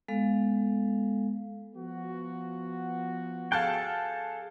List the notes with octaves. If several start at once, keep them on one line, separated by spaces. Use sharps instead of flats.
G#3 B3 A4 F5
F3 B3 F#4
G#4 A4 F5 G5 A5 F#6